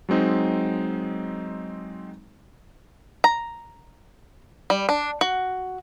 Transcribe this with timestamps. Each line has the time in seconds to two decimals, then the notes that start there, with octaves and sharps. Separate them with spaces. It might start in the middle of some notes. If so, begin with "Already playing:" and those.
0.09 F#3 G#3 C4 D#4
3.24 A#5
4.70 G3
4.89 D4
5.21 F#4